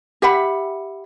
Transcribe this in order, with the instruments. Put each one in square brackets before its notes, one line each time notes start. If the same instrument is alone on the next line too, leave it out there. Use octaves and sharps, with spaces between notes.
[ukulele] G4 E5 F#5 B5